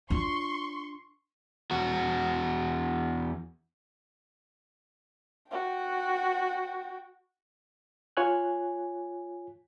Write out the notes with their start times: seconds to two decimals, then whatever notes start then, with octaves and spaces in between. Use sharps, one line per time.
0.10 D4 F4 C6 C#6
1.71 E2 F#4
5.51 F#4 G5
8.17 F4 C#5 G#5 F#6